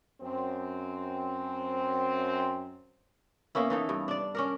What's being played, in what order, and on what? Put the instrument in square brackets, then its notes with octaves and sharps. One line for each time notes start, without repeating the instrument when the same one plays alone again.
[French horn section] F#2 C4
[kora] A#3 B3 C#4 E4
E3 D#4 A4
G2
D4 D5
C#4 D4 A#4